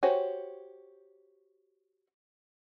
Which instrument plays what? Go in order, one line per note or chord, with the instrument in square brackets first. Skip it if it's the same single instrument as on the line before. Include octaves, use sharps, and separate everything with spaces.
[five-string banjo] F#4 G4 C5 C#5 G#5